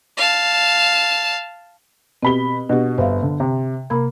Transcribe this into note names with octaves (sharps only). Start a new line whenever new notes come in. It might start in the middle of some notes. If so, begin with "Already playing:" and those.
F5 A5
B2 C4 G4 B5 G7
B2 D4 F#4 G4
G1 C5 E5 F5
D3
C3
C3 A#3 B5 G#6